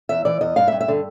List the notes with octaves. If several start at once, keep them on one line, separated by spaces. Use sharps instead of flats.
E2 E5
E3 D5
E2 D#5
G2 F5
E5
G2
E5
D3